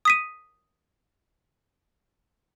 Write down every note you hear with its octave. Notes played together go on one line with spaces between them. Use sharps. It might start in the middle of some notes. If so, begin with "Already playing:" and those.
D#6 B6 D#7